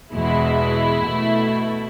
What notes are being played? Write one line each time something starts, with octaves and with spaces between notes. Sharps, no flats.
E2 B2 G#3 E4
B2 A3